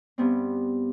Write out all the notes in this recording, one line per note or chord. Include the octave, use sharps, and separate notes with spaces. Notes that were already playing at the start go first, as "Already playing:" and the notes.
G2 B3 C4